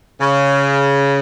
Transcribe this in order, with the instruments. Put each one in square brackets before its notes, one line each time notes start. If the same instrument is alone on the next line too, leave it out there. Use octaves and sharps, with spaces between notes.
[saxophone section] C#3